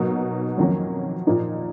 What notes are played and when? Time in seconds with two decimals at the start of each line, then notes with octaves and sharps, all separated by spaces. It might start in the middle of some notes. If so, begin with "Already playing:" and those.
Already playing: B2 F#3 A#3 D#4
0.58 F2 D#3 F#3 A#3 C#4
1.27 A#2 F3 A#3 D#4